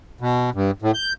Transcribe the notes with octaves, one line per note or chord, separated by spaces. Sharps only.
B2
G2
A2
G6